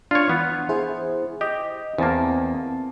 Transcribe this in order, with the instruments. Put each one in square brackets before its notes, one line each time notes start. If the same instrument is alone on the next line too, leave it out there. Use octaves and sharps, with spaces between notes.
[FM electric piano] D4 [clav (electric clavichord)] F4 C#5
[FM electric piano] E3 [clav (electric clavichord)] B3
[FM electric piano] E4 G#4 C5
[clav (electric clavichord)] G4 [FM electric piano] D#5
[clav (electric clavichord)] E2 A#3 [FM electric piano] C4 A5